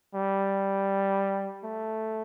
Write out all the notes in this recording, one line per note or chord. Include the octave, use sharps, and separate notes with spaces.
G3
A3